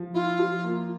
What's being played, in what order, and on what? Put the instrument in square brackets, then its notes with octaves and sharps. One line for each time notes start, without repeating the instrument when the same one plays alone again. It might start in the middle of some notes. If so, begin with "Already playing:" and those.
Already playing: [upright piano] F3
[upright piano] E4 [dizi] F4
[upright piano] F3
A#3